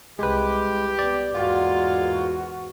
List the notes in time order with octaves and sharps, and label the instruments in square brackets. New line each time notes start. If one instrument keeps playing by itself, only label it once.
[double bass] C2 [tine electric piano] G#3 B4 [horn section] G4
[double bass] B3 [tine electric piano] D5
[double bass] E2 G#2 [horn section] G#3 A#3 F4 [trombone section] F#4